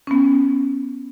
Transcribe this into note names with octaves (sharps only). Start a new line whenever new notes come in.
B3 C#4